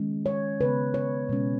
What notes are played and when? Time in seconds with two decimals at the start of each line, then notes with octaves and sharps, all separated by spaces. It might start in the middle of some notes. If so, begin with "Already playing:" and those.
Already playing: D#3 G#3 C#4
0.26 C#5
0.60 C#3 G#3 B3 B4
0.94 C#5
1.29 B2 G#3 C#4